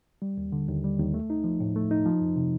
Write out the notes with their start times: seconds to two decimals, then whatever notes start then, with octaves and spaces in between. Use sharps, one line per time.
0.22 G3
0.38 D#2
0.52 D3
0.68 D#2
0.84 G3
0.99 D#2
1.14 A3
1.30 D#4
1.44 F3
1.60 A2
1.76 A3
1.91 D#4
2.06 F3
2.21 F2
2.36 C3